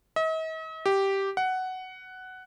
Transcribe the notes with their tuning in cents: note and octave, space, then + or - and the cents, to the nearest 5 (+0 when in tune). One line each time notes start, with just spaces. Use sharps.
D#5 +45
G4 -5
F#5 +10